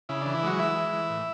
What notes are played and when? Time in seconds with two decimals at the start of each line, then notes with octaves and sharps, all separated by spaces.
0.09 C#3 E4
0.22 E3 D4
0.35 E4
0.43 F#3 G#3 F#4
0.59 E3 E4 E5
0.76 G#3
0.93 E3
1.09 A2